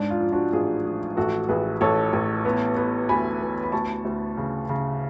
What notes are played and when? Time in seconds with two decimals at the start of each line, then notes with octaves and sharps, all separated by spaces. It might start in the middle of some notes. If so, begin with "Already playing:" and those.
Already playing: G#2 D4
0.10 F4
0.20 F3
0.32 D4 F#4
0.53 A1 F4 G#4
0.85 F3
1.17 A1 F#4 A4
1.48 A1 G#4 B4
1.81 A1 A4 C#5
2.13 A1
2.45 B3
2.76 B3
3.09 D2 G#5 B5
3.41 B3
3.64 B5
3.72 D2 A5 C#6
4.05 D2
4.37 C#3
4.69 C#3